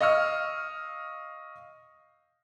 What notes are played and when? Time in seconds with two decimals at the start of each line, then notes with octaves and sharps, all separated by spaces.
0.01 D#5 F5 C#6 E6 F6